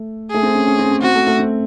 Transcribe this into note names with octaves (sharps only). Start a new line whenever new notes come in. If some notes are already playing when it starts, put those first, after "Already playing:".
Already playing: A3
A3 G#4
C4
C#4
C#4
C4
C#4
C4 F#4
A3
A3
C4